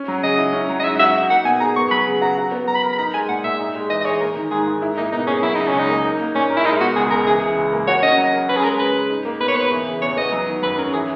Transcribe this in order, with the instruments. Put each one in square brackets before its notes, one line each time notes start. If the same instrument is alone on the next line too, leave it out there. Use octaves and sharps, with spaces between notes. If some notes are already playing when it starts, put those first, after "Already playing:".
Already playing: [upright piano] C#4
F#3
[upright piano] C#3 [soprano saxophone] D#5
[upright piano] E4
C#4
F#3
[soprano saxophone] D#5
[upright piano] G#2 [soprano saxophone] E5
[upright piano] F#4 [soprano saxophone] E5
[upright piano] D#4
[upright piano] A#3 [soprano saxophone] F#5
[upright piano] B2 [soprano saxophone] G#5
[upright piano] G#4 [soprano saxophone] A#5
[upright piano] B3 [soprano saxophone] C#6
[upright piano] F#3 [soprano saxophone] B5
[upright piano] C#3
[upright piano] F#4 [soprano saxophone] A#5
[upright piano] F#4
B3
[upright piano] F#3 [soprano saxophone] A#5
[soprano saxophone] B5
[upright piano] A#4 [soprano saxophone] A#5
[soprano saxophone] B5
[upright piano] D#4 [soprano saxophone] A#5
[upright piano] G#3 [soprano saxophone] G#5
[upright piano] A#2 [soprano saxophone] F#5
[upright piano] A#2 [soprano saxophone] E5
[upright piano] D#4
G#3
[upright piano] E3 [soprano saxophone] D#5
[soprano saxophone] D#5
[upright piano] G#4 [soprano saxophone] C#5
[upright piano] A#3 [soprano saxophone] A#4
[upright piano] D#3
[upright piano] G#2 [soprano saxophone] G#4
[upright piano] G#2
E4
[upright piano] A#3 [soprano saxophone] D#4
[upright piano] B2 [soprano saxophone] D#4
[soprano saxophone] C#4 [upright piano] G#4
[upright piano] F#3 [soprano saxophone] E4
[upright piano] C#3 [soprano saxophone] D#4
[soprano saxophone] C#4
[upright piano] C#2
[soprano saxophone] D#4
[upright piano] A#3
D#4
A#3
[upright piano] A#2 [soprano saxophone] C#4
[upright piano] A#4
[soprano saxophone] E4
[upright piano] G#3 [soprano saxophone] D#4
[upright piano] B2 [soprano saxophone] F#4
[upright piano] C#2 [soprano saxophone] G#4
[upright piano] C#2 [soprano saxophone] A#4
[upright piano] E3 [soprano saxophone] G#4
[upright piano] C#3
C#2
A#3
[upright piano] F#4 [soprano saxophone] C#5
[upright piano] C#4 [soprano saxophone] D#5
[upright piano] F#3
A#4
[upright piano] C#4 [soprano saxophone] B4
[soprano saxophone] G#4
[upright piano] G#3 [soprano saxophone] A#4
[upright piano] C#3 [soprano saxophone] B4
[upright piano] G#4
D#4
A#3
[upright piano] B2 [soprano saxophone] B4
[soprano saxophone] C#5
[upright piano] B2 [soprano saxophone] B4
[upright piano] E3
C#3
[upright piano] E2 [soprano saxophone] C#5
[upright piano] B3 [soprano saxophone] D#5
[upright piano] F#3
D#3
[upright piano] F#2 [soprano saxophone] B4
[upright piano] C#4 [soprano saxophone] A#4
[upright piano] E3 [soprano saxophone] G#4